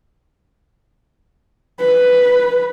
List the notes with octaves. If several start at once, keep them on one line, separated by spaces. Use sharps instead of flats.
B4